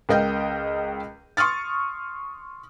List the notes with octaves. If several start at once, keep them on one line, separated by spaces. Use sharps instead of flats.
C#2 A#4 D#5 G5 G6
C6 C#6 D#6 F6 A6